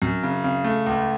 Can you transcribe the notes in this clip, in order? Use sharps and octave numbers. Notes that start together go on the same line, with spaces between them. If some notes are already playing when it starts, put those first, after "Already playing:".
F#2
C#3
C#3
A3
C#2